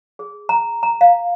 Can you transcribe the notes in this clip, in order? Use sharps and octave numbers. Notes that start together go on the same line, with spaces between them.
G#4
A#5
A#5
F5